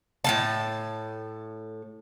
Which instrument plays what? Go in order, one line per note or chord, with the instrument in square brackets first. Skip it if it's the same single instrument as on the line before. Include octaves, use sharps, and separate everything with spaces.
[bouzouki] A2 C#3 A5